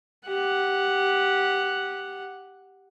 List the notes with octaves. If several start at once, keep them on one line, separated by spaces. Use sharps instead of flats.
G4 F#5